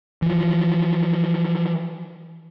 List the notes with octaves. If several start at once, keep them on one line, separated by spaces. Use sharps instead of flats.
E3 F3